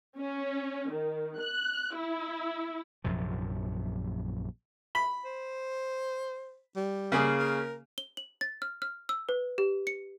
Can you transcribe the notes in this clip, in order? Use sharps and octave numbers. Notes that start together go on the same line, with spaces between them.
C#4
D#3
F#6
E4
A#1 F#2 C3 F3
B5
C5
G3
C#3 A#3 G#4
A#4
G7
F#7
A6
F6
F6
E6
B4
G4
C#7